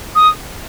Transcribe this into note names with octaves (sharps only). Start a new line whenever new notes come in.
D#6